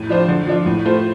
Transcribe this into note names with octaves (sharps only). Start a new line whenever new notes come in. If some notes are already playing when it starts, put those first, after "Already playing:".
Already playing: A2
F3 D4 F4 C5
D3
F3 D4 F4
A2
A3 F4 C5